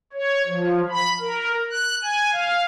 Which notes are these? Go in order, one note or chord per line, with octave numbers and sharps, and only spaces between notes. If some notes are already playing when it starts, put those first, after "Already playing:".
C#5
F3
B5
A#4
F#6
G#5
F5